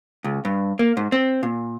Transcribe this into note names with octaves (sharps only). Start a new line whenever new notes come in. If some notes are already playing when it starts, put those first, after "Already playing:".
C#2
G2
A#3
G#2
C4
A#2